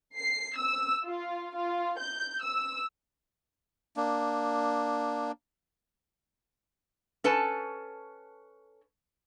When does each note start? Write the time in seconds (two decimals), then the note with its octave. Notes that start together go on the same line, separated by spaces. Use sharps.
0.17 C7
0.55 E6
1.06 F4
1.56 F4
1.98 G6
2.42 E6
3.97 A#3 D4
7.24 C#4 A4 B4 A5